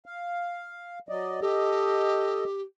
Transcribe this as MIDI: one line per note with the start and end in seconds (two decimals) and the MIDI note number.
0.06 0.99 77
1.09 1.40 54
1.09 1.40 74
1.09 1.40 75
1.41 2.62 67
1.41 2.44 69
1.41 2.44 75